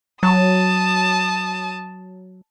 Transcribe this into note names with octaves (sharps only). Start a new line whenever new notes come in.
F#3 A5 D#6